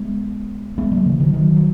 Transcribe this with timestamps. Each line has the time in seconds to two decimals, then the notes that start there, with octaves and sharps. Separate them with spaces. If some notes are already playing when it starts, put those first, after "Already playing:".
Already playing: G#3 B3
0.78 G#3 B3
0.91 F#3 A#3
1.06 C#3 E3
1.20 D#3 F#3
1.33 D#3 F#3
1.56 F#3